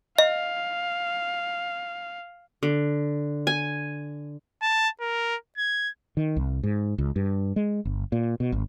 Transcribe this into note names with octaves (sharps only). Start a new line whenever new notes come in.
D#5 F5
D3
G#5
A5
A#4
G#6
D#3
C2
G#2
C#2
G2
G#3
G1
A#2
B2
G#1